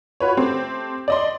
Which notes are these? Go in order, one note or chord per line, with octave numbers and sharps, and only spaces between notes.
F4 F#4 B4 C#5
A3 C4 G4 C5
D5 D#5 C6